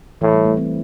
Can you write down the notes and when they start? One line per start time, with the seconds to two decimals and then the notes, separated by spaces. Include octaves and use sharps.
0.22 A2 E3
0.33 G3
0.45 A3
0.57 C4